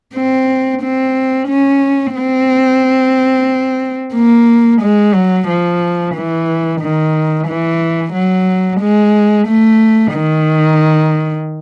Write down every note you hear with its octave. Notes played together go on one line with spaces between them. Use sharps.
C4
C4
C#4
C4
A#3
G#3
F#3
F3
E3
D#3
E3
F#3
G#3
A3
D#3